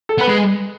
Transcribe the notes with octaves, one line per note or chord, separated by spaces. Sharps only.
A4
B3 B4
G#3